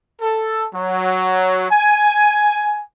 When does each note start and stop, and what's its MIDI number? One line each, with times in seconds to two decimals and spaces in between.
0.21 0.66 69
0.74 1.66 54
1.71 2.83 80